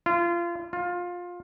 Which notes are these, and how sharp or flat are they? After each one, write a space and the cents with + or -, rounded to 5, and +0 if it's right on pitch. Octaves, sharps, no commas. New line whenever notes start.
F4 -25
F4 +20